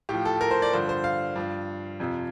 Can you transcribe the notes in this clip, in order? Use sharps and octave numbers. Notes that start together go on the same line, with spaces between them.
A2 F3 G4
A4
A#4
C5
D5
G2 D3 F3 C5
C5
F5
G2 F3
F2 C3 F3